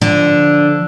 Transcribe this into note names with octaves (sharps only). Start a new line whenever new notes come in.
D3 F3